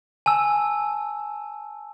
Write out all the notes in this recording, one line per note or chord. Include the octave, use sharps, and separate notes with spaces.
G#5 A5 E6